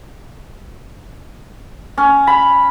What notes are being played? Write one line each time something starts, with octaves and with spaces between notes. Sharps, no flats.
C#4
B5